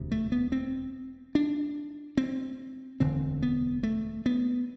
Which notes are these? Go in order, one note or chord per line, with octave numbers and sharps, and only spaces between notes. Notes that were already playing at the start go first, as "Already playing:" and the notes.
Already playing: E1 D2 C3
A3
B3
C4
D4
C4
E1 D2 D3 C4
B3
A3
B3